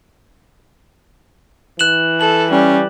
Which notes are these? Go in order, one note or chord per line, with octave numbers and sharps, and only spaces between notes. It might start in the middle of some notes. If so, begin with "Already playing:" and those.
E3 F#6 E7 F#7
A4 F#7
G3 C#4